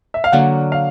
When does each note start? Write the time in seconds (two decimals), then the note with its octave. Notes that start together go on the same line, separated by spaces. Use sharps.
0.14 E5
0.24 F5
0.32 D3 F#3 A#3 F#5
0.72 F5